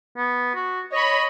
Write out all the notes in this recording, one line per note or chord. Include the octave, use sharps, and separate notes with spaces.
B3
F#4
C#5 D#5 B5